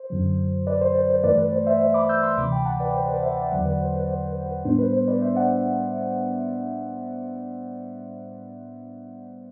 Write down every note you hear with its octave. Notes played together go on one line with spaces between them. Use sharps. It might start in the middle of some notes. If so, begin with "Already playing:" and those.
Already playing: C5
F#2 D3 F#3
B4 D5
C5
C5
C5
G2 E3 A3 B4 D5
B4
C5
C5 E5
C5 E5
B5 D6
E6 G6
C6 E6
D2 C3 E3 B5 D6
G5 B5
F#5 A5
B4 D5
C5
B4 D5
C5 E5
D5 F#5
E2 D3 F#3 D5 F#5
B4 D5
C5
B4 D5
C5
B4
B4
A2 G3 B3 D4 C5
B4
C5
B4 D5
C5 E5
D5 F#5